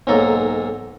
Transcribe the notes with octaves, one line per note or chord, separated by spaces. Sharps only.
B1 G#2 F#3 A#3 A4 A#5